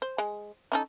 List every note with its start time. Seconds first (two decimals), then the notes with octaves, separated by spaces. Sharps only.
0.02 C5
0.18 G#3
0.72 C#4 D#4 A4